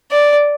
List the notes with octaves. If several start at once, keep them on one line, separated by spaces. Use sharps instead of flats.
D5